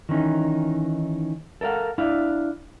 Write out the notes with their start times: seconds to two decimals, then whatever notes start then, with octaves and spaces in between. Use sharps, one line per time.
0.09 D#3 E3 C#4 D#4
1.61 A4 A#4 D#5 F5 F#5
1.98 D4 E4 D5 F5